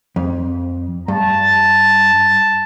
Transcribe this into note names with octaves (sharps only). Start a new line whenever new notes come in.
F2
G2 A5